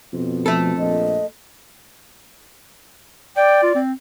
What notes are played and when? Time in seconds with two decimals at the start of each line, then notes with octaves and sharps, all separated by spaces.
0.13 F2 B2
0.46 F3 A3 A4
0.77 A#1 D#5
3.36 D5 G5
3.62 F4
3.75 C4